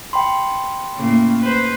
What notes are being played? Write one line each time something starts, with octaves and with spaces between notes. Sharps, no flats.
G5 B5 C6
A2 C#3 A#3
B4 C5